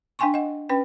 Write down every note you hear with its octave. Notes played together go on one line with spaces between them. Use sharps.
D4 F5 G5 G#5 C6 C#6
D#5 F#5
C#4 B4 G5